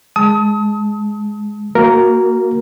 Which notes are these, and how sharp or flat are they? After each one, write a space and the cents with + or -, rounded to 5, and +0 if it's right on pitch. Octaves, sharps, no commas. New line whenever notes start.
G#3 +5 A5 +0 D#6 +35
A#3 -25 F#4 +0 A#4 +0